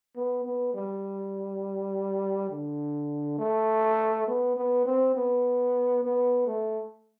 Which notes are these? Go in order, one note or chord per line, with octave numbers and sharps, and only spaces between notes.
B3
B3
G3
D3
A3
B3
B3
C4
B3
B3
A3